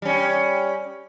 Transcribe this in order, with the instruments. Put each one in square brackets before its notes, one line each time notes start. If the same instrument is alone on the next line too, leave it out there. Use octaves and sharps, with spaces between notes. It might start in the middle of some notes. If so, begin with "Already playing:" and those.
[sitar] G3 C#4